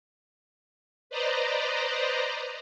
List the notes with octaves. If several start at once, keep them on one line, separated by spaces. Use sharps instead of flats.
B4 C5 D5 D#5 A#5